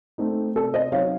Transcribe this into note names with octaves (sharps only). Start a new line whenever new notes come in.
A3 C4 D#4
C3 A4
C5 D#5
F#3 C4 D#4 C#5 F5